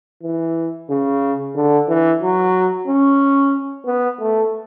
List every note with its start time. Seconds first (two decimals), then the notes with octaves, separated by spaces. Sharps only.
0.23 E3
0.90 C#3
1.56 D3
1.89 E3
2.22 F#3
2.88 C#4
3.86 B3
4.20 A3